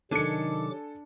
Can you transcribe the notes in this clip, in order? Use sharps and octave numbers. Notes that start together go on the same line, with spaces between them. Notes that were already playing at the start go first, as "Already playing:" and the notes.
C3 D#3 F#3 D4 A4 G#5 D6 C#7